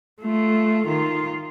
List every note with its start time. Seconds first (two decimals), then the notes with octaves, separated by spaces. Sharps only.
0.21 A3 F4
0.88 D#3 F4